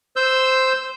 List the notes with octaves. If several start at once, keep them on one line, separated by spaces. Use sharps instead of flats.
C5 E6 G6